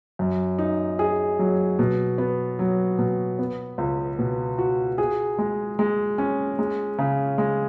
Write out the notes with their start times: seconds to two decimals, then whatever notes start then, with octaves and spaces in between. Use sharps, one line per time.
0.19 F#2
0.59 D#4
0.99 G#4
1.39 F#3
1.79 B2
2.18 B3
2.59 F#3
2.98 B2
3.39 B3
3.78 C#2
4.19 B2
4.59 F#4
4.98 G#4
5.38 G#3
5.79 G#3
6.18 C#4
6.59 G#3
6.98 C#3
7.38 G#3